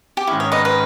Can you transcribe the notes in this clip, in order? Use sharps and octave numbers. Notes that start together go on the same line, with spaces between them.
G4
G#2 D#3 G#3 C#4 E4
C#5
B4 D#5
B4 D#5